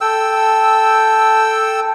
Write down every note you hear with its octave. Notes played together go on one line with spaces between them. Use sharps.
A4 G5 E6